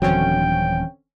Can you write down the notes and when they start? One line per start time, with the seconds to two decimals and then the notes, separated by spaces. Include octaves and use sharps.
0.02 D#1 B1 D3 E3 F#3 C4 C#4 G5